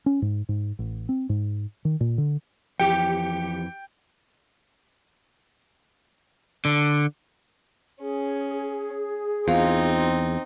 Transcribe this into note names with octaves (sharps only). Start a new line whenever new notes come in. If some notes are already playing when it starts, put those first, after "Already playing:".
C#4
G#2
G#2
A1
C4
G#2
D#3
A#2
D3
F2 E3 G4 G5 C#7
D3
C#4 G#4
E2 C4 D#4 F4